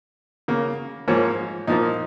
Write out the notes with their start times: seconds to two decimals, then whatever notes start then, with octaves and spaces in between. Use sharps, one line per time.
0.48 C#3 A#3
1.08 G#2 F3 A#3 C#5
1.67 A#2 F3 A#3 D#4